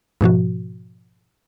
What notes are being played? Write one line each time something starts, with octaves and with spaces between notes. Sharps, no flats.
G#2 B2 F3 F#4